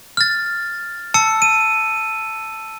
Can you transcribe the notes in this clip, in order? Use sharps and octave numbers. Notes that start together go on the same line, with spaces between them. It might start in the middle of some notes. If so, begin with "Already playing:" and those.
F6 A6
A5 E6 C#7
D#7